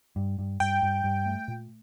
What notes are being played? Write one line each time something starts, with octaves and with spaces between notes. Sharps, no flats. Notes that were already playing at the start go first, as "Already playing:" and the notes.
G2
G2
G2 G5
G2
G2
A3
A#2